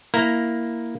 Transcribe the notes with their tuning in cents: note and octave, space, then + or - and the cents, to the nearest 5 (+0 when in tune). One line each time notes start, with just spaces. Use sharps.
A#3 +0 E4 +0 A#5 +0